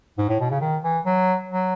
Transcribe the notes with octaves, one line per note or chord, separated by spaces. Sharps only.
G#2
A2
B2
C#3
D#3
E3
F#3
F#3